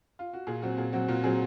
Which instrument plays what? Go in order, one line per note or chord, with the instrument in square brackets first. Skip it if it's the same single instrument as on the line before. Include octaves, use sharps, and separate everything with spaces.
[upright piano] F4
F#4
A#2 G#4
F#3 C4 F#4
A#2 G#4
F#3 C4 F#4
A#2 F#4
F#3 C4 G#4